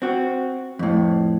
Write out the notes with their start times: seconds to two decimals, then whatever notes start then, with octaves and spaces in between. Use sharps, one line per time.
0.02 C4 F#4
0.79 F2 A2